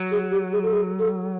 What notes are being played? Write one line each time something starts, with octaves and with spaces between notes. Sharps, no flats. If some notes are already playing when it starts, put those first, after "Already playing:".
Already playing: F#3
G#4
G4
G#4
A4
G#4
A4